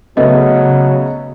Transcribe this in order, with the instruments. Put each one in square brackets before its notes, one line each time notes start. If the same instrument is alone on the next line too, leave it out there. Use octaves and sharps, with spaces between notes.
[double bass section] C#3 [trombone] F#3 [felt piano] A3 B3 [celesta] D#5